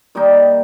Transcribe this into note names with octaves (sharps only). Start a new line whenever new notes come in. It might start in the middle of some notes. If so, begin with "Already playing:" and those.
D#3 G3 A#3 D#4